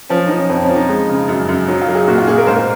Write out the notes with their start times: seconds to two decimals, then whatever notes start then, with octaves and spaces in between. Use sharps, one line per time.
0.09 F3 C#4
0.27 F3 D#4
0.38 C#4
0.49 F2 C4
0.63 C#4
0.69 F3
0.76 D#4
0.89 G#3
1.09 C#3
1.29 F#2
1.49 F#2
1.68 F#3 D#4
1.82 F4
1.88 F#3
1.95 G#4
2.08 A#2 F#4
2.18 F4
2.27 A#2 G#4
2.38 A#4
2.47 G#2 C5
2.56 A#4